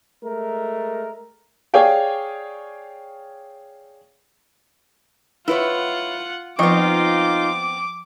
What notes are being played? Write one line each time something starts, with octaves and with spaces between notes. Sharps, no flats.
G#3 A3 A#4
G#4 C#5 D5 F5 G5 G#5
E4 F4 B4 C#5 F#5
F3 B3 C4 D#4 F4 D#5 C#6 D6